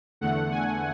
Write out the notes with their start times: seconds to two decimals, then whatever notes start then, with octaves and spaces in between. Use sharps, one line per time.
0.21 E2 D3 A3 F#5
0.52 G#5